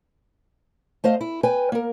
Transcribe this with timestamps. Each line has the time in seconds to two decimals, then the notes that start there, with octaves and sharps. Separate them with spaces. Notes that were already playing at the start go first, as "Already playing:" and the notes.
1.04 A3 C5 D#5 F5
1.21 E4
1.43 B4 G5 G#5
1.72 A#3 A#4